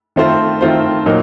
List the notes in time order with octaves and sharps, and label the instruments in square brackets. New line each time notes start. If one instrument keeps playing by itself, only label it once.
[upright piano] D#3 A3 C4 F4 C5
D#3 A3 C4 F4 C5
A#2 F#3 A#3 D#4